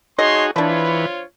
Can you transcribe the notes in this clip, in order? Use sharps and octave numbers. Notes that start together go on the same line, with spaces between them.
A3 D#4 F#4 G#4 C#5 D#5 C6
E3 F3 D4 F4 B4 C#5